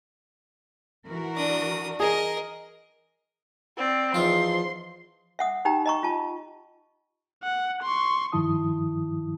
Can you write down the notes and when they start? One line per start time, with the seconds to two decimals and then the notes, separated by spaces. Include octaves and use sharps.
1.06 E3 F#4 A#4
1.35 D4 D#6
2.00 G#4 A#4 D#5
3.77 C4 D5
4.14 E2 F3 D#4 F4 C6
5.39 E5 F#5 D#6
5.65 D#4 G4 G5 A#5
5.86 D#5 A#5 C#6
6.03 F4 A5
7.43 F#5
7.83 C6 C#6
8.32 G2 D#3 F3 E4 A5 D#6